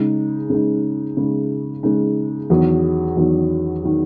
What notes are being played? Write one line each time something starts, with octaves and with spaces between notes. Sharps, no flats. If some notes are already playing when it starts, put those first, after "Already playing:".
Already playing: C#3 G#3 D#4
C#3 G#3 D#4
C#3 G#3 D#4
C#3 G#3 D#4
E2 D#3 F#3
E2 D#3 F#3
D#3 F#3